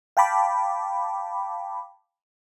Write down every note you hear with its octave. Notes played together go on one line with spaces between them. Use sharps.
F5 G5 A5 B5 D6